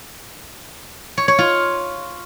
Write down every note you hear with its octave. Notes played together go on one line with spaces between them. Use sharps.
C#5
C#5
F4